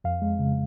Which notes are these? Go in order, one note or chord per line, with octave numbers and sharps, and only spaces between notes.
F2 F5
G#3
C#3